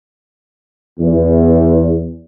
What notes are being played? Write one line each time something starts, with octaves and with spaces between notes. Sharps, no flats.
E2